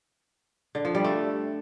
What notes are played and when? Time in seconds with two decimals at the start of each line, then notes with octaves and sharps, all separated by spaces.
0.75 D3
0.85 F3
0.95 G3
1.05 A3